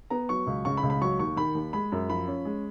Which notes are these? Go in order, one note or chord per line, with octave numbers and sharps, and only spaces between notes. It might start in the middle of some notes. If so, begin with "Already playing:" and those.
B3 A#5
F#3 C#6
C#2
C#3 C#6
B5
C#2
B5
F#3 C#6
D#2 C#6
D#3 B5
D#2
G#3 B5
F#2
F3 B5
C#4
G#3